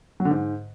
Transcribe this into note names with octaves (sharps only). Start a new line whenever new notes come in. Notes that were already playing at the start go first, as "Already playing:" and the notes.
F#3
D3
G#2